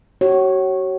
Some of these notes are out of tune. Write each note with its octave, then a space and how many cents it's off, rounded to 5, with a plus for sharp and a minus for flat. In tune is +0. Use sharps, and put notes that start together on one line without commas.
F#4 +40 C#5 -15